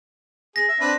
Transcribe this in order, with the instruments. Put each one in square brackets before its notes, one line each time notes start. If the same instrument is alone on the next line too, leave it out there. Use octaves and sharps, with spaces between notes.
[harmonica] G#4 [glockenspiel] A#6
[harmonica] E5
C4 D4 B4